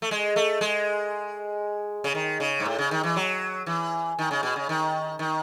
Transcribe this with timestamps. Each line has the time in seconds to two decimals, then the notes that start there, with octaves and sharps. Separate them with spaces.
0.02 A3
0.11 G#3
0.36 A3
0.61 G#3
2.04 C#3
2.15 D#3
2.40 C#3
2.60 G#2
2.66 A2
2.79 C#3
2.91 D#3
3.03 E3
3.16 F#3
3.66 E3
4.19 D#3
4.31 C#3
4.43 B2
4.56 C#3
4.69 D#3
5.19 D#3